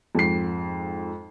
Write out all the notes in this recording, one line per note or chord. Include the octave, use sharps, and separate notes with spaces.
F2 G#2 C7